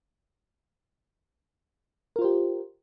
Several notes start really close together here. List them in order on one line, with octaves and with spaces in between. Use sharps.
A#4 F4 C5 G4